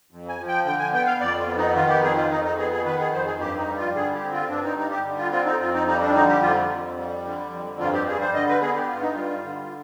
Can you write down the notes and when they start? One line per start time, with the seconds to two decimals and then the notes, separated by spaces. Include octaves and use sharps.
0.11 F2
0.29 G#5
0.38 F3
0.48 G5
0.65 D3 G5
0.79 G#5
0.93 B3 G5
1.06 F5
1.21 F2 D5
1.39 F4
1.47 B3
1.58 D#4
1.76 D#3 F4
1.89 G4
2.03 F2 G#4
2.16 F4
2.30 F2 D#4
2.44 D#4
2.58 B3 G#4
2.72 G#4
2.85 D#3 B4
2.99 G#4
3.13 F2 C5
3.26 G#4
3.40 G2 G4
3.58 D#4
3.67 G3
3.77 F4
3.95 D3 G#4
4.14 G4
4.23 C4
4.32 F4
4.49 G2 D4
4.64 D#4
4.77 G3 D#4
4.91 G4
5.04 D3
5.18 F4
5.32 C4 F4
5.46 D#4
5.60 F2 F4
5.74 D#4
5.87 G3 D#4
6.02 D4
6.15 D3 D#4
6.28 G4
6.42 F2 F4
6.70 F2
6.98 G3
7.24 D3
7.51 F2
7.80 G2 F4
7.93 G4
8.06 G3 G#4
8.21 C5
8.34 D3 D#5
8.49 B4
8.61 B3 G#4
8.75 G4
8.88 G2 F4
9.01 D#4
9.14 G3 F4
9.44 D3